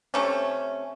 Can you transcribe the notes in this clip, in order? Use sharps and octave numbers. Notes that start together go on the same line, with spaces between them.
C3 A3 C#4